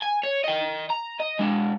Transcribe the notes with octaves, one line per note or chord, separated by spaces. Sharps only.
G#5
C#5
D#5 G5
A#5
D#5
G#3 D4